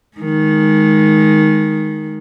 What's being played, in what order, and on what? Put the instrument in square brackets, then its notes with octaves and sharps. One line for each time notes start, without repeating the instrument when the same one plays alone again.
[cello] D#3 G#3